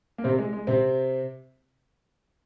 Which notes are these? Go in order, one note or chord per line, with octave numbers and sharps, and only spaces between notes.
A#3
C3 C4
G#3
G#3
C3 C4